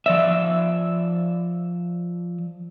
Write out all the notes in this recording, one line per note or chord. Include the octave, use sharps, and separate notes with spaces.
F3 D5 E5